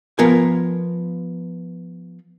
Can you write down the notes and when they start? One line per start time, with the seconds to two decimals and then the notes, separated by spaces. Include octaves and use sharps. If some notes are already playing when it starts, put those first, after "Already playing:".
0.19 F3 B3 F4 A#4 G#5